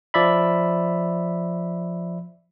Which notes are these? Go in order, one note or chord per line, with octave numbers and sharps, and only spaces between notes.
F3 D5 E5 B5